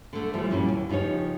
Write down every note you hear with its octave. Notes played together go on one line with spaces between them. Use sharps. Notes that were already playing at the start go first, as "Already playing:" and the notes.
D3 A3
A2 E3 F3 G3 A3
A#2 F#3 G3 C#4
D#2
C#3 F3 D#4 G4 C#5